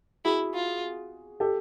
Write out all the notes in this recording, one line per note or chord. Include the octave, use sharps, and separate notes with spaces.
E4 F#4 G#4
F4
G4 A4